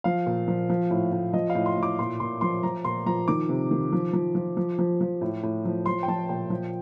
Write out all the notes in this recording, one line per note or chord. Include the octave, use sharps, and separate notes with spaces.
F3 F5
A#2
F3
F3
A2
A2
F3 D#5
F5
A2
C6
A2
D6
A#2 C6
A#2 C6
F3 C6
F3 A#5
A#2 C6
F3 A#5
D#3 D6
C3
D#3
F3
F3
F3
F3
F3
F3
A2
A2
F3
F3 C6
G5
F3 A5
A#2 G5
F3